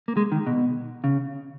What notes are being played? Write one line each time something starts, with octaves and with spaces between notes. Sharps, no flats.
A#3
G#3
D#3
B2
C#3